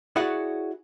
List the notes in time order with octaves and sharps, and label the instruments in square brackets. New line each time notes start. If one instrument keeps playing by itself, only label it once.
[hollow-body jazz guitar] E4 F#4 G#4 C#5 D5 F#5